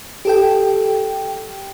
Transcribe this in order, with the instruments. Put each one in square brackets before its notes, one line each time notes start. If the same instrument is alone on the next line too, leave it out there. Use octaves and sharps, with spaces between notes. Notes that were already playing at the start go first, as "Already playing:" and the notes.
[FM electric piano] G4 A4 G5